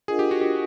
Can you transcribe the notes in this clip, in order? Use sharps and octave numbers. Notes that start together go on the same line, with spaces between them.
D4 F4 G#4 A#4 D#5 F#5
G4
F#4
G4